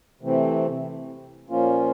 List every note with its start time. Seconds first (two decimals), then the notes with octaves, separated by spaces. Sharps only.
0.21 C3 E3 A3 C4
1.50 A#2 F3 A#3 C#4 F4